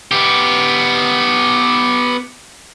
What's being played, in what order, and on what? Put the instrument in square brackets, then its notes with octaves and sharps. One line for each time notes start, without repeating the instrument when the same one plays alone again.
[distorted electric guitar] B3 G4